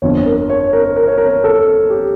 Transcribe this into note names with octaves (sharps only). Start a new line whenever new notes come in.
G1 F2 D3 C#5
A#4
C#5
A#4
A#4
C#5
A#4
A4
G4